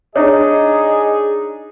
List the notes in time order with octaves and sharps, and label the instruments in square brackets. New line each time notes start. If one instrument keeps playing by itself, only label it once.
[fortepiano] D4 D#4 [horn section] G#4 [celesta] C#5 [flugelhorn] D#5